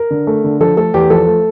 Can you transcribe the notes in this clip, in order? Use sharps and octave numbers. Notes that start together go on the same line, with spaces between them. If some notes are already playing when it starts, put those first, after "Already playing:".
Already playing: A#4
D3
A3
D3
F3 A4
A3 A4
E2 G4
F3 A4
A3